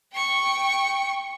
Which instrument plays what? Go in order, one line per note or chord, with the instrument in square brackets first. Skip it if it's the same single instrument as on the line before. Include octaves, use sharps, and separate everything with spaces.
[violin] G5 C#6